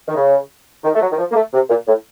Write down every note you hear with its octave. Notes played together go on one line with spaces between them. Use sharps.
D#3
C#3
D#3
A3
F#3
D#3
F3
A#3
A3
C3
A#2
A2